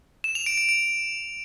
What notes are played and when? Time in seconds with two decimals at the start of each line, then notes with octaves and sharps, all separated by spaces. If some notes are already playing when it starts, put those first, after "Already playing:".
0.24 E7
0.35 F7
0.46 D7
0.58 D7
0.69 D7